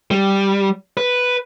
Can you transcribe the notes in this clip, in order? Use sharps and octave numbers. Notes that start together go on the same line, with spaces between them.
G3
B4